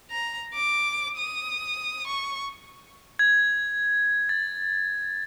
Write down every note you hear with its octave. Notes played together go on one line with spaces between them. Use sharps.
A#5
D6
D#6
C#6
G#6
A6